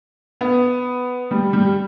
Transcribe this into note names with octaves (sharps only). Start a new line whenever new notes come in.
B3
G3
G3